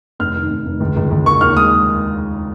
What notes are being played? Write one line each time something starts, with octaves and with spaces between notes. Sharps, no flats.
F1 F6
D#3
F1
F1
C#2
C#2
C#2
A#3 C#6
D#2 F6
G#3 D#6